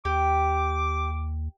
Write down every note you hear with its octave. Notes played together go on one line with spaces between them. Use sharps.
D#2 G4 D6